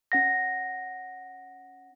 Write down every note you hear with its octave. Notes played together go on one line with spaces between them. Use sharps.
C#4 F#5 A#6